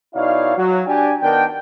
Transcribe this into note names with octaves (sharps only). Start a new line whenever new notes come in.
B2 D#4 E4 C#5 D5 F5
F#3
D4 G4 D5 G5 G#5
D#3 B3 D4 A#4 G5